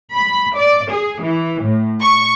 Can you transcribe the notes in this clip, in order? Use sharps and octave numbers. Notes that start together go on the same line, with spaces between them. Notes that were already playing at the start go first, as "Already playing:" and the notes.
B5
D5
G#4
E3
A2
C#6